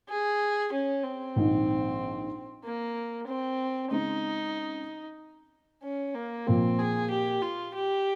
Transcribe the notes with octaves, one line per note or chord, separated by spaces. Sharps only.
G#4
C#4
C4
A#1 G#2 D#3
A#3
C4
C#3 G#3 C4 D#4
C#4
A#3
A#2 F3 A#3 C4
G#4
G4
F4
G4